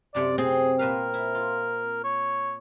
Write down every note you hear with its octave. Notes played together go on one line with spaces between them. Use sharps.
F#2 C3 A4 D5
C4 G#4
A#2 A#4 B4 F5
E4
F4
C#5